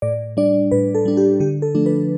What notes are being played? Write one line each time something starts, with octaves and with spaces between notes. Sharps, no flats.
A2 D5
G3 D4 D5
A2 B4
A4
G3 D4
G4
D3 G4
A4
F3 A3 D4
B4